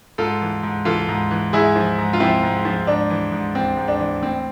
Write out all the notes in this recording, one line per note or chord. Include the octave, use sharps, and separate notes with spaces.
G#2 F4 A4
E3
G#2
E3 F4 A4
G#2
E3
G#2 E4 G#4
F3
G#2
F4
F3 C4 E4
G#2
F3
G#2 D4
E3
G#2
E3 C4
G#2
D4
E3
A2 C4